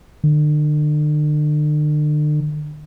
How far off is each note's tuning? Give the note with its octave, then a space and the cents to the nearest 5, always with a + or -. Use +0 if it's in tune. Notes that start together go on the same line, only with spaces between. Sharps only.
D3 +40